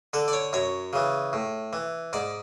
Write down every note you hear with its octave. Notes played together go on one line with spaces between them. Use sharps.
D3 A4
D5
C#5
F#2 C#5
C#3 E3
A2
E3
G#2 D5